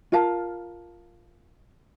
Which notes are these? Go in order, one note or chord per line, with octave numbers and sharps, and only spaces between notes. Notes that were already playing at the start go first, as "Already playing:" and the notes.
F4 A#4 F5 A5